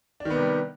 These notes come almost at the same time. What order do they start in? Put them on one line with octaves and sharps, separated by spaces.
D4 D#3 B3 C3 G3